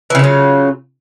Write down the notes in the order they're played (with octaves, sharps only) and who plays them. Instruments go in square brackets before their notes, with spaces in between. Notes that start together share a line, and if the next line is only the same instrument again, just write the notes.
[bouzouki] E3
C#3
F4
F#3